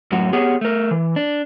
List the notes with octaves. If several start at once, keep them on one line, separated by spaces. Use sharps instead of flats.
F#2 A2 F#3 F#4
B3 G4 G#4 C#5 F#5
A3 A#4
E3
D4